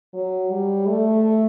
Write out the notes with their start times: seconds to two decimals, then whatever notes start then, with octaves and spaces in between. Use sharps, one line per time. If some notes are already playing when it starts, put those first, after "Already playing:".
0.14 F#3
0.51 G3
0.88 A3